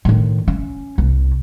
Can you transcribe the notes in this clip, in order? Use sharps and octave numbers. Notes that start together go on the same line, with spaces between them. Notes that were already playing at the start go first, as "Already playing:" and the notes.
A2 D#3
C#4
C2